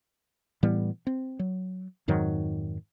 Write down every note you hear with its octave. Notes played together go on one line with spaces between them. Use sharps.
A2 E3 G3 B3
C4
F#3
F2 G#2 D#3 F#3